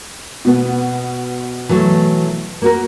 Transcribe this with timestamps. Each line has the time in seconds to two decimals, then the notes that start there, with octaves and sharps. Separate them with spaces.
0.45 B2 B3
1.69 E3 F#3 A3
2.62 A#3 F#4 A#4